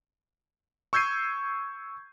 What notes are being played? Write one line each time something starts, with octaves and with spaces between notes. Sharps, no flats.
C#6 E6 G6 G#6 C7 D#7